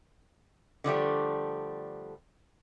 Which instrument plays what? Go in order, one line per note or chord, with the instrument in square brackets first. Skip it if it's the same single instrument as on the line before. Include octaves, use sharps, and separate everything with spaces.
[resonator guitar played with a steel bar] D3 F3 G3 A3